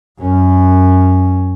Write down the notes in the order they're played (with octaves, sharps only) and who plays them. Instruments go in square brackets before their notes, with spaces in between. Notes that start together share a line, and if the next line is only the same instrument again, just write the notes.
[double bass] F#2 C#4